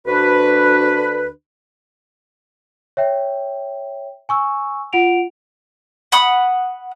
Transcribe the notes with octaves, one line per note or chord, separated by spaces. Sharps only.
D2 D3 D4 F#4 B4
C#5 E5 G5
G#5 C#6 E6
F4 F#5 D7 F7
F#5 B5 D#6